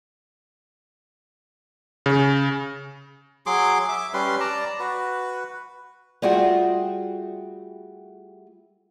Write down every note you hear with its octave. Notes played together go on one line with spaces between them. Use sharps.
C#3
F#3 G#4 C6 D6
E5 D6
G3 C#4 B4 C6
D5 A5 A#5
F#4 B4
G3 A3 F4 F#4 G#4 G5